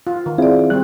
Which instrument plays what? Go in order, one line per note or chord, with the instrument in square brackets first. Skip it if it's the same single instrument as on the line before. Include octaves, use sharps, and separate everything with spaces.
[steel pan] F4
D#3
[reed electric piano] C4 E4 F4 [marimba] G#4 D5
[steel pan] G3 C4 [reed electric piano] F#6